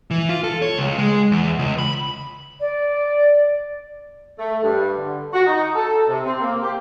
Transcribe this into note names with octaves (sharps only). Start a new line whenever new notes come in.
E3
F4
A4
C#5
C#2
G#3
E2
C#2
B5
D5
A3
G2
D3
F#4
D#4
A4
C3
C4
A#3
G4